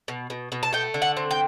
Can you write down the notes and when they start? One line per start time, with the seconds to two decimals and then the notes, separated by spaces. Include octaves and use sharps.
0.08 B2
0.30 B2
0.52 B2
0.63 A5
0.73 A3 G5
0.94 D3
1.02 F#5
1.17 C4
1.31 G5